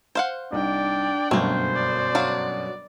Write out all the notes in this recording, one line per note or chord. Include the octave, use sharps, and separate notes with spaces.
C5 F5 F#5
C2 D4 D#4 D5 G5
G1 F#2 B2 A3 A#3 C5
D5
F#3 D4 F5